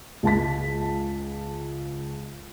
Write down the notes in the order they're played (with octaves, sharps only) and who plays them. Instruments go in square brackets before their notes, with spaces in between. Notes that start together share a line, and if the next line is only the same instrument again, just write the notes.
[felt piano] C#2 A5 B6